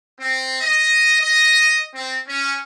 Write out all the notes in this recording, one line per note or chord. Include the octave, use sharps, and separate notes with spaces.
C4
D#5
D#5
C4
C#4